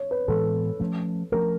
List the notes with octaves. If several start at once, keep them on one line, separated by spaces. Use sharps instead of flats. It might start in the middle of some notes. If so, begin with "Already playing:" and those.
Already playing: C#5
B4
A2 E3 G#3 B3 A4
F3 A3 C#4
F3 A3 C#4 A#4